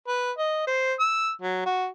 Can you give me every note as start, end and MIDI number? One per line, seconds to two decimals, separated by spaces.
0.08 0.32 71
0.38 0.65 75
0.67 0.94 72
1.00 1.30 88
1.42 1.61 54
1.66 1.87 66